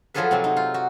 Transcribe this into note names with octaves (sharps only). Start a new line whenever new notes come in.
F3 F#3 F4 G#4 A4 B4
C3 F#3 C4
D#4
F4
F#4